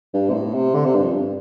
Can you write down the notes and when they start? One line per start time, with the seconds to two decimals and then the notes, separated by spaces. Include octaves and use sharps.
0.14 G2
0.30 C3
0.33 A2
0.54 C3
0.74 D3
0.85 C3
0.94 G2
1.04 F2
1.15 G2